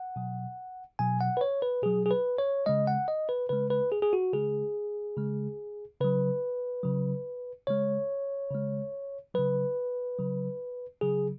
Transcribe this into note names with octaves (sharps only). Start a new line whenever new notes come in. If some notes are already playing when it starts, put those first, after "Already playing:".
Already playing: F#5
B2 F#3
B2 F#3 G#5
F#5
B4
C#5
B4
B2 F#3 G#4
G#4
B4
C#5
C#3 G#3 D#5
F#5
D#5
B4
C#3 G#3 B4
B4
G#4
G#4
F#4
C#3 G#3 G#4
C#3 G#3
C#3 F#3 B4
C#3 F#3
C#3 G#3 C#5
C#3 G#3
C#3 F#3 B4
C#3 F#3
C#3 F#3 G#4